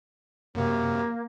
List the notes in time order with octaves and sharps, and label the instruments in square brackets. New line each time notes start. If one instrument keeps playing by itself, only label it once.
[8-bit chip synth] F#2 C3 [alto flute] A#3